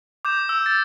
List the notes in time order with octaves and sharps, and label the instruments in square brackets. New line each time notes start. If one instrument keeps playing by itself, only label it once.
[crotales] D6 G6 E7
E6
A6